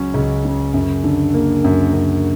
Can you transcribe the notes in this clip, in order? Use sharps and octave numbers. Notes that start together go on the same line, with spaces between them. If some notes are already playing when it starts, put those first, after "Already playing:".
Already playing: C#2 C#3 F#3 C#4
C#2
C#3
F#2
D3
A#3
F#2
F#2